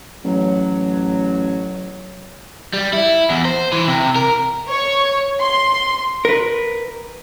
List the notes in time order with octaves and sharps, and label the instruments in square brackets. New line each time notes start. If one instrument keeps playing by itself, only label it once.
[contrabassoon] A1 [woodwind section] F#3
[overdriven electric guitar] G3
E4
E2
C5
E3
C3
A#4
[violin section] C#5
C6
[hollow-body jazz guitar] A#4 B4